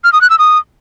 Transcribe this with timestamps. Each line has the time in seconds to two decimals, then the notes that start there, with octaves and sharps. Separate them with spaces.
0.04 F6
0.13 D#6
0.21 F#6
0.30 E6
0.39 D#6